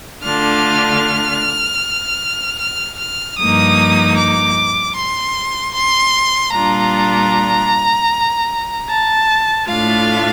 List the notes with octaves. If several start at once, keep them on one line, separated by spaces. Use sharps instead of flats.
D3 A3 D4 F4 F6
F6
F6
G2 F3 A#3 D#4 D#6
D6
C6
C6
A#2 G3 D4 F4 A#5
A5
A2 A3 D4 F4 F5